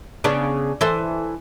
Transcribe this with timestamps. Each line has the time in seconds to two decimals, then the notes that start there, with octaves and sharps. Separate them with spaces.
0.24 C#3 B3 D4
0.81 E3 A4 C5